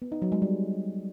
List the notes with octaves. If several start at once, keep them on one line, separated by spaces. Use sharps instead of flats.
B3
D#4
F#3
G#3
G3